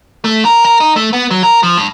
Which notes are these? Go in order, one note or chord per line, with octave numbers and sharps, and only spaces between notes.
A3
A#4
A#4
D#4
A3
B3
F#3
A#4
F3
G2